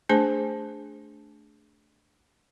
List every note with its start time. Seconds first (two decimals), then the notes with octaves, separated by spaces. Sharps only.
0.09 A3 D4 G#4 C5 A5